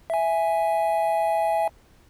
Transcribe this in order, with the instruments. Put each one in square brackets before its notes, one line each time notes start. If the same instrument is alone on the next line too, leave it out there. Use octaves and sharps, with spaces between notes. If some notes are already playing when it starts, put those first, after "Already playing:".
[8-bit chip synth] E5 G#5